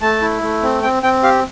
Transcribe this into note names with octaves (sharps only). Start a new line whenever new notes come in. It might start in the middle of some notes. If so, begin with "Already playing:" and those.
A3 A5
E4
A3
C4
C4 G5
C4 G5
G4 F5